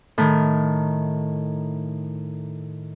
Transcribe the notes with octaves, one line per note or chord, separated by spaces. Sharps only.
A2 D#3